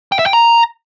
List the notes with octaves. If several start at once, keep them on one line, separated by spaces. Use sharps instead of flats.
G5
E5
G5
A#5